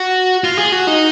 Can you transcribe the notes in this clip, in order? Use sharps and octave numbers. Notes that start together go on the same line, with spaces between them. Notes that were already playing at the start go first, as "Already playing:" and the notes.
Already playing: F#4
F4
G#4
F#4
D#4